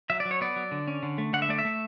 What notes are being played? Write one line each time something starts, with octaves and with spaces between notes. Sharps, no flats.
F#3 E5
D5
F#3
C#5
B3 D5
F#3
D3
C#4
D3
A3
D3 F#5
E5
A3 D5
E5
A3